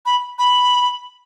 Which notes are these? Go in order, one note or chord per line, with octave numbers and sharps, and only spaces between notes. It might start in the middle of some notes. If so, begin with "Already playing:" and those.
B5
B5